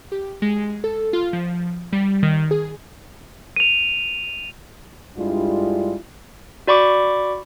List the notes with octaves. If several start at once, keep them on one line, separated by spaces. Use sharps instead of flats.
G4
G#3
A4
F4
F3
G3
D#3
G#4
D#7 F7
G2 G3 G#3 D4 E4 F4
F#4 D5 B5 C#6 D6